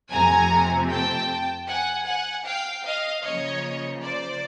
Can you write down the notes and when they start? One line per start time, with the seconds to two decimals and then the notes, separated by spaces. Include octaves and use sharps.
0.11 F2 C3 F3 A3 C4 G#5 A#5
0.89 G5 A5
1.67 F#5 G#5
2.06 F#5 G#5
2.45 F5 G5
2.84 D#5 F5
3.23 C#3 F3 A#3 C#5 D#5
4.02 C5 D5